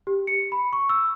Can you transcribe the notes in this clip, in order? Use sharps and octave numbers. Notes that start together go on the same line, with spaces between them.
G4
C#7
B5
C#6
E6